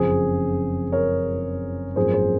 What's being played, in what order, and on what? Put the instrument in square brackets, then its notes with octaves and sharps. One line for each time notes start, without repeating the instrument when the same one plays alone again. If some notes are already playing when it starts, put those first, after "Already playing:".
Already playing: [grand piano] F#1 F2 C#3 F3 G#4 C5
A#4 C#5
G#1 F#2 F3 A#3 C#4 G#4 C5
G#4 C5